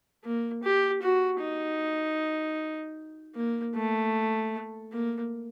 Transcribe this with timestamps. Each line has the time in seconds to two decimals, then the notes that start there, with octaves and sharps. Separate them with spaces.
0.24 A#3
0.64 G4
1.02 F#4
1.41 D#4
3.35 A#3
3.75 A3
4.92 A#3